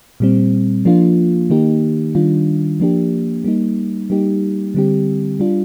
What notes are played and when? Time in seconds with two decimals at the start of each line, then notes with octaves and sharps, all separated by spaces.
0.20 A#2 G3 C4
0.85 F3 A#3 D4 F4
1.50 D#3 A#3 D#4 G4
2.15 D#3 G3 D4 F4
2.80 F3 A#3 D4 G4
3.44 G3 A#3 D#4
4.10 G3 A#3 D#4 G4
4.74 D3 G3 C4 G4
5.40 G3 D4 F4